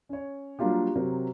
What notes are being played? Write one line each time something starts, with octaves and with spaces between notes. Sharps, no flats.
C#4 C#5
F#3 G3 A#3 D4 F4 G4
C3 F#3 C4 A#4